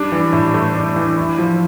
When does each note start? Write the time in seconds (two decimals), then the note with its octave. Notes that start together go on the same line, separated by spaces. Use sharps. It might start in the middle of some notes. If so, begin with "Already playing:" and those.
Already playing: G3 D4
0.12 E3
0.33 A2
0.54 A3
0.75 D4
0.96 E3
1.18 E4
1.38 F3